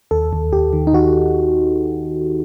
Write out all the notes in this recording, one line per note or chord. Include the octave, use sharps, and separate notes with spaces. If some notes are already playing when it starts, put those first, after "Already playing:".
D#2 A4
D#2
D#2 G4
D#3
D#4
D#3 F#4